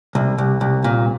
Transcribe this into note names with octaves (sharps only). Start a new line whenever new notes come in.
C2
C2
C2
A#2